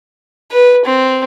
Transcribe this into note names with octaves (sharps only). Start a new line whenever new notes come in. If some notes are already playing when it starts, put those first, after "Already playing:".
B4
C4